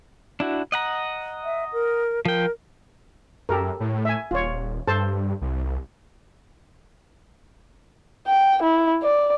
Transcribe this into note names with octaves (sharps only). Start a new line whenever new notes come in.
D4 E4 F#4
D#5 F#5 A#5
E5
A#4
F3 A#4 G5
F#2 G4 A4 A#4
A2
E5 G#5
D#1 F4 C#5
G2 A4 C5 A5
C2
G5
E4
D5